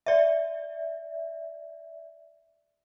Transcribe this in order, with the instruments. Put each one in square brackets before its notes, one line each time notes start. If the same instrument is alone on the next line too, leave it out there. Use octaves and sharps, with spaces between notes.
[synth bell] D5 E5